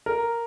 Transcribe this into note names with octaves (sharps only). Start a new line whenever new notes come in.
A#4